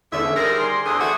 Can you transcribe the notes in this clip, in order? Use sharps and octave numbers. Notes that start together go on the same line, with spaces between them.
E2 G#2 D3 C#4 E5
D#3 G3 G#4 A#4 C5 D5 A#6
C6
E2 D3 D#6
A3 F#4